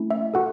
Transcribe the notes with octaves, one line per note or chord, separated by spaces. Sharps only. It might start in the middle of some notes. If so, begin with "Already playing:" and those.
Already playing: A3 C#4 E4
E5
F#4 A4 F#5